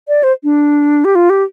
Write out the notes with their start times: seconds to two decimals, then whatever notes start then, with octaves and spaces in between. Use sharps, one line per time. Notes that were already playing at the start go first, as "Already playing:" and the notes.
0.08 D5
0.23 C5
0.44 D4
1.05 G4
1.15 F4
1.30 G4